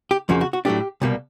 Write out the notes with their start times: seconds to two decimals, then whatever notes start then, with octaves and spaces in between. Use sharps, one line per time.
0.11 G4
0.29 F2 C#3 F3 A#3 F#4
0.41 F#4
0.53 F#4
0.65 A2 F#3 A3 D4 G4
1.02 C2 B2 G3 A#3